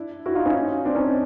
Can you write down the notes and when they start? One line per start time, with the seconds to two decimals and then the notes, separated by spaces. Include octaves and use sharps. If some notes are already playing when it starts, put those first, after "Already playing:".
Already playing: D4 E4
0.26 E4 F#4
0.35 D#4 F4
0.46 C#4 D#4
0.85 C4 D4
0.95 C#4 D#4